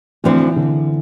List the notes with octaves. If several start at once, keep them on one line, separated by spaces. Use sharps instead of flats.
D2 D3 E3 F3 C4
D3